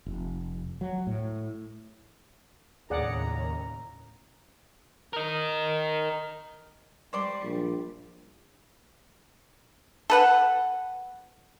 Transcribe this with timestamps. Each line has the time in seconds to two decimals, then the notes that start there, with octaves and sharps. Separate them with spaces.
0.06 F1
0.81 F#3
1.07 A2
2.90 D#2 A2 C#3 G#4 D5 F#5 A#5
5.13 A#4 D#5
7.13 G3 C5 D5 C6
7.43 A#1
10.10 A4 B4 F#5